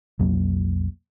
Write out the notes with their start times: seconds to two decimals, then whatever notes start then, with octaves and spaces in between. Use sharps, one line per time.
0.19 B1 F2 F#3 A#3